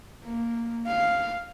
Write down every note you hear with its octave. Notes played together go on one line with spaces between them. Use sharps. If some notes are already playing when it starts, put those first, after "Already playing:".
A#3
F5